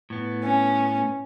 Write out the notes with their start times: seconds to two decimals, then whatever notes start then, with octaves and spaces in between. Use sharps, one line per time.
0.10 A2 B3
0.43 C#4